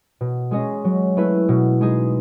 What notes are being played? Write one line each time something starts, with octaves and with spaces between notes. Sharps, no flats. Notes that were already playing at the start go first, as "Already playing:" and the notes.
B2
G#3 C#4 G#4 D#5
F#3
A3 E4 B4 E5
B2
G#3 D#4 G#4